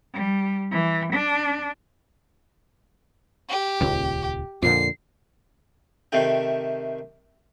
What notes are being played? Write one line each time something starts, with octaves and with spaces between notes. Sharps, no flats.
G3
E3
D4
G4
D#1 C#2
F2 A#2 D3 C7
C3 D#3 A3 G5